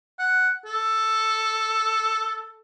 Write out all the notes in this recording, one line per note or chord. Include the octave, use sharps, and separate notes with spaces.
F#5
A4